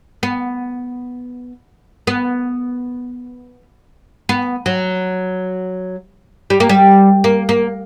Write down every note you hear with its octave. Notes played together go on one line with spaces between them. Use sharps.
B3
B3
B3
F#3
G3
A#3
G3
A#3
A#3